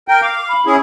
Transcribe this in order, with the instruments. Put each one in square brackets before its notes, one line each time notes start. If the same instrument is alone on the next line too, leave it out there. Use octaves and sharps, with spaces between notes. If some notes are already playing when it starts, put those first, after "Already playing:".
[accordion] A#4 G5
[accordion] F5 [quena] D6
[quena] B5
[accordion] C#4 E4 G#4